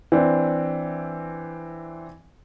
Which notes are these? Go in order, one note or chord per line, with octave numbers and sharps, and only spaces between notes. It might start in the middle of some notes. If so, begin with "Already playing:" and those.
E3 C4 D4